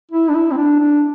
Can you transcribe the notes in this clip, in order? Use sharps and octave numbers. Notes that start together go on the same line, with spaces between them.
E4
D4
E4
C4
D4
D4